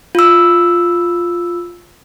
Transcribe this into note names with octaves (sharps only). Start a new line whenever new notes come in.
F4 E6